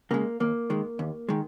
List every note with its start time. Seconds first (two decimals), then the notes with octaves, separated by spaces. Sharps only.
0.11 C#3 G#3 A#3
0.40 D#2 A#3
0.70 D#3 G#3
0.99 D#2
1.29 D#3 G#3